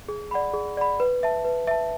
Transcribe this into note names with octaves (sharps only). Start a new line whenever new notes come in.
G#4
D5 F#5 B5
G#4
D5 F#5 B5
B4
E5 A5
B4
E5 A5